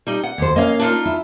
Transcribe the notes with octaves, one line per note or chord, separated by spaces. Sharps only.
G3 D#4
F#5
D#2 C5
A#3 C#4 D#5 F5
D4 D#4 F4
E4